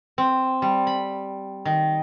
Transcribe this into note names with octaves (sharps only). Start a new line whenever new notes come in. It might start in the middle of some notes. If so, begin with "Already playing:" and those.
C4
G3
B5
D#3